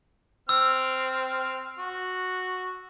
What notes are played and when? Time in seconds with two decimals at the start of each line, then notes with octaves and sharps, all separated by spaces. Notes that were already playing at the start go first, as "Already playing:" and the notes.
0.49 C4 E6 F6
1.79 F#4